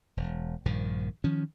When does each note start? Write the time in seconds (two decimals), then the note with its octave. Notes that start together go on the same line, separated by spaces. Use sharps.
0.17 E1
0.65 A#1 G2 D#3 F3
1.24 D#3 F3 C#4